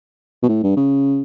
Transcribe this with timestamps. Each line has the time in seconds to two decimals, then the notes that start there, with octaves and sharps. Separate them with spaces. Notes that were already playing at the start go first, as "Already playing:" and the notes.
0.43 B2
0.49 A2
0.63 G2
0.77 C#3